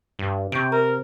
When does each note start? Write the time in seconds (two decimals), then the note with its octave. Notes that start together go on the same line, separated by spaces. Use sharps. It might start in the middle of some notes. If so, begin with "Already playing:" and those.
0.19 G2
0.52 C3 C#6 G6 D7
0.72 A#4 A#5